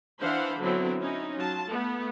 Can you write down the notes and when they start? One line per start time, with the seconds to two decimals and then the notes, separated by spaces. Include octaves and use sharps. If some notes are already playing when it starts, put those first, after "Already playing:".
0.22 E3 D4 C5 F5 F#5 B5
0.61 D3 F#3 B3 C4 E4
1.00 C#4 D#4 E4
1.37 F#3 F4 A5
1.68 A3 B3